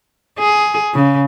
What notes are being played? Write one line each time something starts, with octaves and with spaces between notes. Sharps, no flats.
G#4
C#3